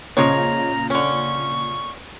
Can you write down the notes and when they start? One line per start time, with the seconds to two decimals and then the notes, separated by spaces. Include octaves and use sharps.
0.17 A#2 C#3 F3 G#3 C#5 A#5
0.90 D3 C#4 C#6